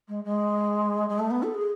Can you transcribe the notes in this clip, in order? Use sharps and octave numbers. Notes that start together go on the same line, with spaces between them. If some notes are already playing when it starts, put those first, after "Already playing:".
G#3
G#3
G#3
A3
B3
A4
G#4